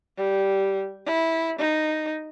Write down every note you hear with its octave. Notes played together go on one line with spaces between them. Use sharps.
G3
E4
D#4